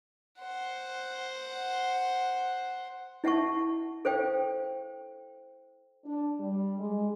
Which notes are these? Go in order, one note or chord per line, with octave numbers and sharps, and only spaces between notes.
C5 F#5
E4 E5 F#5 A5 C#6
A4 C5 F5 G5
D4
G3
G#3